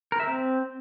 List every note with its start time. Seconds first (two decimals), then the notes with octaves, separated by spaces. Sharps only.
0.12 A#4
0.20 E5
0.27 C4